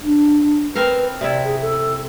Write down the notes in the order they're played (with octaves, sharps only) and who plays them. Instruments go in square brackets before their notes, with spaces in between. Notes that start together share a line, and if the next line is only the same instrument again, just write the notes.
[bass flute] D4
[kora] C4 A#4 F5 [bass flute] B4
[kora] C3 E4 [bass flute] D5
[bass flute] G#4
A4